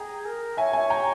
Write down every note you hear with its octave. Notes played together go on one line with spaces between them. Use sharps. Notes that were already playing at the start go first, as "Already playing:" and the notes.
Already playing: G#4 G5 A#5
A#4
C#5 E5 G#5
E5 G#5
G5 A#5